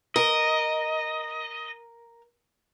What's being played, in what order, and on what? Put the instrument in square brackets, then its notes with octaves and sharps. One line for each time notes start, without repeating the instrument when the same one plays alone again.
[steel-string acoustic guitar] A#4 [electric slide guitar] D#5